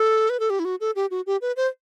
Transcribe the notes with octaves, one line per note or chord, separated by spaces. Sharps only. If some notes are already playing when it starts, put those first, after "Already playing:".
Already playing: A4
B4
A4
G4
E4
F#4
A4
G4
F#4
G4
B4
C5